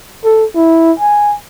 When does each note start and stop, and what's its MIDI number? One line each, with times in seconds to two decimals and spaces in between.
0.24 0.45 69
0.55 0.92 64
1.00 1.35 80